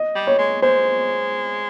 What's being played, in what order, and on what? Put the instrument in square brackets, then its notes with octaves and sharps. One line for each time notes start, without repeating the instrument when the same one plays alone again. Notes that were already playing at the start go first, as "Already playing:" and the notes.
Already playing: [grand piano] D#5
[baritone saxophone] G3
[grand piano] C#5
[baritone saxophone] G#3
[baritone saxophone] G#3 [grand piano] C5